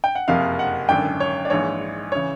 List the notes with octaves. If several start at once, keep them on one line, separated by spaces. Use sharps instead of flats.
G5
F#5
F#1 F2 C3 F5
F#5
G#1 F#2 D3 G5
C#5
D5
A#1 G#2 E3 C#5
C#3 E3 C#5